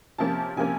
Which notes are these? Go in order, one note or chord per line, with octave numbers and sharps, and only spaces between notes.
C3 F3 A#3 C#4 A5
C3 F3 A#3 C#4 G#5